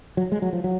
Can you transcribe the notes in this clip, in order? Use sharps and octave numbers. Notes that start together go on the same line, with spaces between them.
F#3
G#3
F#3
F3
F#3